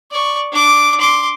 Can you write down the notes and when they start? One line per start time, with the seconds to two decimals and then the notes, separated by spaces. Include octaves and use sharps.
0.11 D5 C#6
0.52 D4 D6
1.00 C6 D6